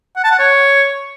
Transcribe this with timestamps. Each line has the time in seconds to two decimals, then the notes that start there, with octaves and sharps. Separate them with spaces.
0.16 F#5
0.24 A5
0.31 F#5
0.39 C#5